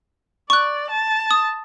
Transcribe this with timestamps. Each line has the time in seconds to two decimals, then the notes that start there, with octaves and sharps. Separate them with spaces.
0.50 D5 C#6 F#6
0.91 A5
1.31 D#6